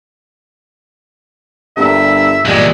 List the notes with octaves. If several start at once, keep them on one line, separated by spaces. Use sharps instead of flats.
G1 G2 A#4 E5
A#2 E3 G3 G#3 F5